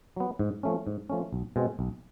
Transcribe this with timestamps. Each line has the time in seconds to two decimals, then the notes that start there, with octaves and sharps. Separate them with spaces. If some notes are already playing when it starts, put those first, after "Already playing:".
0.16 F#3 B3
0.39 G#2
0.63 F3 A3 C#4
0.87 G#2
1.10 F3 A3 C#4
1.33 B1
1.56 B2 G#3 C4
1.79 B1